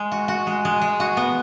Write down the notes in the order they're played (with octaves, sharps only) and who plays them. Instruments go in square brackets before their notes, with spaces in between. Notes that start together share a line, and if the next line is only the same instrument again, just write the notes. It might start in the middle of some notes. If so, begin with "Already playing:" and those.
Already playing: [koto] G#3
F#4
F#4
G#3
G#3
G#3
F#4
B3